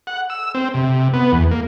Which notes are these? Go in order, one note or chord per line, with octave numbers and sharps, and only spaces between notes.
F#5
E6
C4
C3
B3
E2
A#3